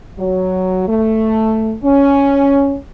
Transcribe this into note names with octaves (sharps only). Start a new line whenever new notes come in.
F#3
A3
C#4